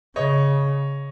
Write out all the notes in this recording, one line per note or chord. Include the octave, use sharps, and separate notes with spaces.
C#3 C#5 D#5